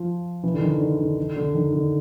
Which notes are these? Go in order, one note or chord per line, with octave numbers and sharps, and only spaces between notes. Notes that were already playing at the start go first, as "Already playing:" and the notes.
Already playing: F3
E3
D3
D#3
D3
D3
D3
D3
D#3
D3